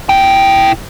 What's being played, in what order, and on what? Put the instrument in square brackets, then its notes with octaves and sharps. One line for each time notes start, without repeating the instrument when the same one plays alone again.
[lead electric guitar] E4 G5